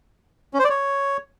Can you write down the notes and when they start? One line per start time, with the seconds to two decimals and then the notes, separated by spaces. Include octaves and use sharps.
0.54 C#4
0.59 C5
0.64 D5
0.70 C#5